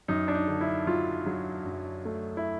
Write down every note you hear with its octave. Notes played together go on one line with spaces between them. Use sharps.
F#2 D#4
D4
D#4
D3
E4
F#3 F4
F#3
F#2
A3
E4